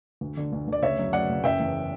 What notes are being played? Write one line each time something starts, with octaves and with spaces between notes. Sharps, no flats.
D2
D3
D2
D2 D5
C#3 C#5 E5
F#2
F#2 D5 F#5
C#3
F#1 E5 G5
E2